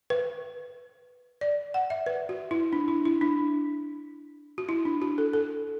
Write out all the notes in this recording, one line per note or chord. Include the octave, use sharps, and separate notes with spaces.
B4
D5
F#5
E5
B4
F#4
E4
D4
E4
E4
D4
F#4
E4
D4
F#4
A4
A4